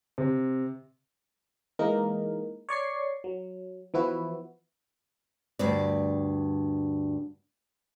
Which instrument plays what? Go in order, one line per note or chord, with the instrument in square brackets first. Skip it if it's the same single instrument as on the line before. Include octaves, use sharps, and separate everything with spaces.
[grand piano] C3
[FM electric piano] E3 G#3 A#3 D#4 A#4
C#5 D5 C#6 C7
F#3
E3 F3 B3 E4 F#4 B4
[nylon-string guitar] D2 G2 D5